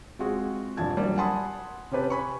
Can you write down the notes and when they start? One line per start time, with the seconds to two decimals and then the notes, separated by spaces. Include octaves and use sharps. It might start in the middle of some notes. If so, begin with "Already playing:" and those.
0.19 G#3 C4 F4 F#4 G#4
0.77 E1 G2 F3 A5 G#6
0.97 F#3 G3 A#3 D4
1.18 F#5 G#5 A5 B5 C6 D#6
1.91 C3 C#4 G4 B4 A5
2.10 G#5 B5 C#6